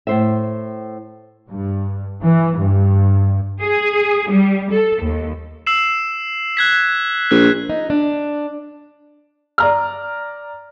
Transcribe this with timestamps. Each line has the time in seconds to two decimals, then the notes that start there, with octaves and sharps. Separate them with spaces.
0.07 A2 C5 E5
1.48 G2
2.24 E3
2.59 G2
3.61 G#4
4.30 G3
4.72 A4
5.03 D#2
5.67 E6 C7 E7
6.57 F#6 G#6 B6
7.31 A#1 F#6
7.70 D#4
7.90 D4
9.58 D5 A#5 F6